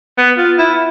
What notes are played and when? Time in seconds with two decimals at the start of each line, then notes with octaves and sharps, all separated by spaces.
0.18 B3
0.37 F4
0.58 E4